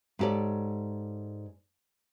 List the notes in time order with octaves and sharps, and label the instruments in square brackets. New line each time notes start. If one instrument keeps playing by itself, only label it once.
[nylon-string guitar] G#2 E4 G4 A4 C#5 D5